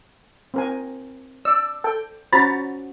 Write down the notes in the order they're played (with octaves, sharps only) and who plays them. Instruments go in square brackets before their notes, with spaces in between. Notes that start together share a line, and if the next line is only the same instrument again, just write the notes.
[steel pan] C4 A#4 G#5
[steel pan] D5 [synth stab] E6
[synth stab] A4 [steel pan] G5
[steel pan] C#4 F#4 C5 [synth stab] A#5 B5 A6